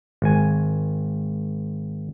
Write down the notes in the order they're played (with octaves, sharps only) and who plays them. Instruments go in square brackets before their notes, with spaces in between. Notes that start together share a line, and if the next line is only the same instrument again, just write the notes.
[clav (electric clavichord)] G#1 G#5